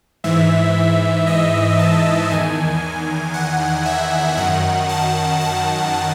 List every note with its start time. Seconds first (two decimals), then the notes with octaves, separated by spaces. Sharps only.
0.24 G#2 E3 E5
1.27 D#5
1.79 A5
2.30 E2 D#3 G#5
3.34 F#5
3.86 E5
4.37 F#2 D#3 F#5
4.89 A5
5.41 A5